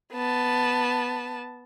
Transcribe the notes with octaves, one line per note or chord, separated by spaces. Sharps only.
B3 A5